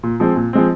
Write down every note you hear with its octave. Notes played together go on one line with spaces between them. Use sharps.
A#2
F3 G#3 C4
A#2
F3 G#3 C4